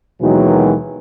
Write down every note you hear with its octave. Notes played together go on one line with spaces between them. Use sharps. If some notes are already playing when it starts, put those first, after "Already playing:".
D#2 B2 D#3 E3 F#3 G#3